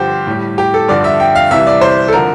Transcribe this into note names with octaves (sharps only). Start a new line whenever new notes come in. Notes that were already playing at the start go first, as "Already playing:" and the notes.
Already playing: G2 D3 F3 G4 C5
A2 G3
G4
A4
G2 D3 F3 D5
E5
G5
F5
C2 C3 E3 G3 E5
D5
C5
A4
D3 F3 A#4